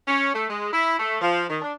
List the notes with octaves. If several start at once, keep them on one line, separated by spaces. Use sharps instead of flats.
C#4
A3
G#3
E4
A3
F3
D#3
D4